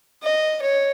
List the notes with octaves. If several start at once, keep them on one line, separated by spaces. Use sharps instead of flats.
D#5
C#5